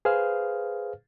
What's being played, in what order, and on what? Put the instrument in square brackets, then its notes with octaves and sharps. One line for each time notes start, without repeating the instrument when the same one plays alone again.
[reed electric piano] G#4 B4 C5 F5 F6